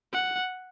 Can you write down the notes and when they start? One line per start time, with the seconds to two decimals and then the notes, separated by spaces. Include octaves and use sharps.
0.13 F#5